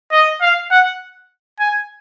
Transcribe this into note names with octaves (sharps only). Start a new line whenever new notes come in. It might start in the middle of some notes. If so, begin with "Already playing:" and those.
D#5
F5
F#5
G#5